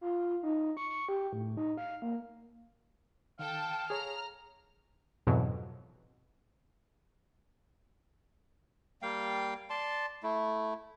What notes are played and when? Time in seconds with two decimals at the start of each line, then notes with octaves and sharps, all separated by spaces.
0.01 F4
0.43 D#4
0.77 C#6
0.90 C#6
1.09 G4
1.33 A2
1.57 D#4
1.77 F5
2.02 A#3
3.39 D#3 A4 F5 G5 A5
3.90 G#4 C#5 A#5 F6
5.27 F2 G#2 B2 E3 F#3
9.02 G3 A#3 F5 G5
9.70 D5 A5 C6
10.23 A3 E4